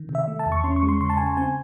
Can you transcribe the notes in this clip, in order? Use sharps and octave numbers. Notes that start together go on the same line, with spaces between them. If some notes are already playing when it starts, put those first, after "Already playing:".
Already playing: D#3
C3
E5
A3
A5
E2
C#6
C#4 C6
C#6
G#3
C6
C#3 C6
A5
C#3 G#5
A5
C4 G#5